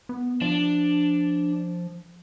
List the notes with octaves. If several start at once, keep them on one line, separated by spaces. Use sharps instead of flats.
B3
F3 D4